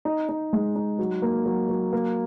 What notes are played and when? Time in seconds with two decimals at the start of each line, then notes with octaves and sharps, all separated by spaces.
0.05 D#4
0.29 D#4
0.53 G#3
0.76 D#4
0.99 F#3
1.22 A#3
1.46 F#3
1.69 F#3
1.93 A#3